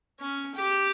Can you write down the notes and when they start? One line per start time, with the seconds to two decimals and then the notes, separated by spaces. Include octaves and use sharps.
0.19 C#4
0.55 G4